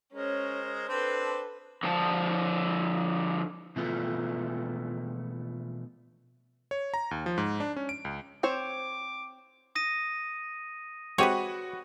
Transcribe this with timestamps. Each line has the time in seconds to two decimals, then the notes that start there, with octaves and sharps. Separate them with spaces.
0.14 G#3 C#4 A#4 C5 C#5
0.88 C4 D4 A4 B4 C5
1.83 D3 F3 G#5 A5
3.76 B2 E3 F3 A3 B3 F4
6.71 C#5
6.94 A#5
7.11 D#2
7.26 F3
7.38 G#2
7.60 D4
7.76 C#4
7.89 D7
8.05 C#2
8.43 C4 C5 C#5 D6
9.75 D#6 A#6 D#7
11.18 G#3 C4 F#4 G4 B4 C#5 F#5 D#7